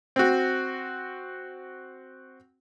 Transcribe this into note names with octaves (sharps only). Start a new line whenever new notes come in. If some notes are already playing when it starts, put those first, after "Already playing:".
C4 F#4